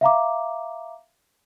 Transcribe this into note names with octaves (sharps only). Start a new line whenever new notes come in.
E5 F5 A#5 D6